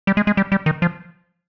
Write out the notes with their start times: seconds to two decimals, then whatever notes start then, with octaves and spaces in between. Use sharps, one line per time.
0.07 G3
0.17 G#3
0.27 G#3
0.37 G3
0.52 G3
0.66 D#3
0.82 F3